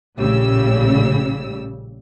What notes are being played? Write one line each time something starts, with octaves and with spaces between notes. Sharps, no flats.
A#1 A2 C#3 G3 E6